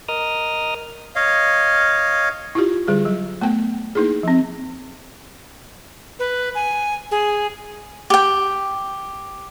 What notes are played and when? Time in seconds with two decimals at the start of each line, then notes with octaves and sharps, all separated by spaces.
0.08 A#4 D#5 D#6 F6
1.16 C#5 D#5 F5
2.55 E4 F4 G4
2.87 D3 G3 G#4
3.05 F#3
3.41 A3 B3 G5
3.95 A#3 D#4 E4 G#4
4.23 F3 C4
6.19 B4
6.55 G#5
7.11 G#4
8.10 G4 G5